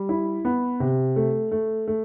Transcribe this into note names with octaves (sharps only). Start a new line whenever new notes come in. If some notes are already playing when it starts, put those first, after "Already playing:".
Already playing: G3
E4
B3
C3
A3
A3
A3